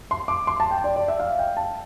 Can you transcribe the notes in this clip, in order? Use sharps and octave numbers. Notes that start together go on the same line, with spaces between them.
C6
D6
C6
A5
G5
D5
D5
E5
F5
G5
A5